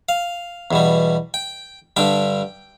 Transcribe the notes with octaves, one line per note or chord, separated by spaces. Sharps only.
F5
E2 B2 G3
G5
G2 D3 G3 G5